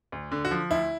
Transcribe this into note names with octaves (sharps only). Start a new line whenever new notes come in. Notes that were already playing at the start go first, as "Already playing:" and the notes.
D2
D3
F#4
F3
D2 E4